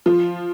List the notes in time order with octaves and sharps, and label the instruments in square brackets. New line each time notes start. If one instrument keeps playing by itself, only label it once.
[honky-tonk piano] F3 F4